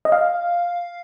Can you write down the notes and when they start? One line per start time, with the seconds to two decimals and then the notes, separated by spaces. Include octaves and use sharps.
0.05 D#5
0.12 F5